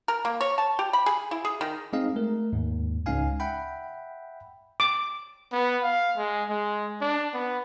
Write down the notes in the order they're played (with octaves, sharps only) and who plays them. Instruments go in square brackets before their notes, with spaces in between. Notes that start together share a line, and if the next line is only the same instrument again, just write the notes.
[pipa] A#4
A#3
C#5
A5
G4
B5
G#4
E4
G#4
D#3
[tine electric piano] G#3 C4 D#4 G#4 D#5 F5
A3 A#4
D#2 G#2
C#2 C#4 D#4 F5 G#5
E5 F#5 G5 B5
[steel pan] D6
[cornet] B3
F5
G#3
G#3
D4
B3